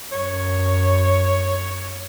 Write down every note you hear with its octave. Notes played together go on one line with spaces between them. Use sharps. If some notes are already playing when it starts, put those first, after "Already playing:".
F#2 C#5